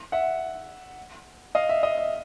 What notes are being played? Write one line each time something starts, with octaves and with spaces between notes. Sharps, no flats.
E5 F#5
D#5 F5
E5
D#5
E5